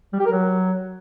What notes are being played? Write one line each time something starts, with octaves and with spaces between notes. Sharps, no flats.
G3
G4
A#4
F#3